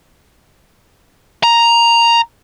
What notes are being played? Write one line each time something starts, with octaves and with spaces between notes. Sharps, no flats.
A#5